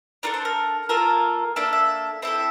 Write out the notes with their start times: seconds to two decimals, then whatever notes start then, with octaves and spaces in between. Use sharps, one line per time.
0.23 D4 F4 A4 A#4
0.34 C5
0.45 A#4
0.89 A#3 F4 A4 A#4
1.56 A#3 D4 A4 E5
1.73 E5
2.22 C4 E4 A4 E5